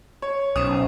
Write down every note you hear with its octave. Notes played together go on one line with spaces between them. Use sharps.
C#5
B1 C#4 C5 D#6 E7